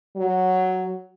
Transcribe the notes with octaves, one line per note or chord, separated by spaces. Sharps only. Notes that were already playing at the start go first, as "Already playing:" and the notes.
F#3